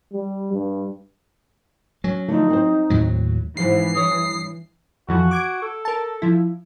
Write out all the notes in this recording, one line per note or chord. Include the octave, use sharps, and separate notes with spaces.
G3
G2
F#3 C#4
D3 F3 A3 D#4
C4 C5
D#2 A2 F#3
G#2 C3 E3 F3 C7
G2 C#5 D#6
F2 E3 F3 F#4
D6 G#6 D7
A4
A#4 A5
F3 E4